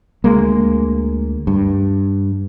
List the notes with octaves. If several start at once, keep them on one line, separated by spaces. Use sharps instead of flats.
D2 G#3 A#3
G2